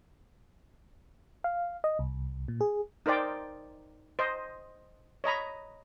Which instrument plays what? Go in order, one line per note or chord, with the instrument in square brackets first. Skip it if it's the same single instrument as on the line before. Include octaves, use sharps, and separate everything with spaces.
[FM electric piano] F5
D#5
C2
A#2
G#4
[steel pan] D#4 A#4 C5 D5 G5
C5 D#5
C#5 D#5 A#5 B5